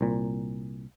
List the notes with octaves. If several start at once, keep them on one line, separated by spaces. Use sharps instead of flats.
C2 A#2